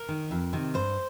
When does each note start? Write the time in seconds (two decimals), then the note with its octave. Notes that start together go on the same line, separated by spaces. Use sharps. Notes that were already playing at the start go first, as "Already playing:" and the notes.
Already playing: A#4
0.09 D#3
0.31 F2
0.53 C3 D#3
0.74 G2 C5